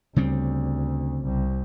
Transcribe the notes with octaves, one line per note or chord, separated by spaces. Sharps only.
D2 C#3 G3 C4
C2